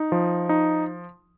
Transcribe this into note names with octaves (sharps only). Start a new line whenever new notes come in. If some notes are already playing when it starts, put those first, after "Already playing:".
Already playing: D#4
F3
D#4